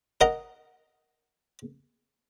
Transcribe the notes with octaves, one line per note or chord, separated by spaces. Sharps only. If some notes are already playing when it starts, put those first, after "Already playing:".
A#4 D#5 F#5 A#5